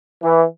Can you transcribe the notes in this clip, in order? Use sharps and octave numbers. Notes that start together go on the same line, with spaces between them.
E3